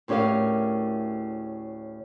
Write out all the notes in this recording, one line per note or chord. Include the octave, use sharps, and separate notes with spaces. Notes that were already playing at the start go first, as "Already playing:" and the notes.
D2 A2 C#4 G4 A#4 F5